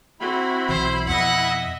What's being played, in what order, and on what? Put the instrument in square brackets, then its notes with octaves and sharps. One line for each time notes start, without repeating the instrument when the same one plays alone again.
[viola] C4 F#4 [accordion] E4 B5
[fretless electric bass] B1 E3 [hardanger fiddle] C5
[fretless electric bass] F2 B2 [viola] D#5 E5 [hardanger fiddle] F#5